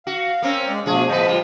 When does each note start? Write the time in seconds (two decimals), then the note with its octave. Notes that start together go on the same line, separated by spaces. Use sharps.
0.07 F#4 F5
0.42 A#3 C4 C#4
0.68 G#3 D5
0.86 B2 F3 A3 D4 G#4
1.09 A2 F3 B3 B4 D#5 A5
1.28 A#2 G3 F4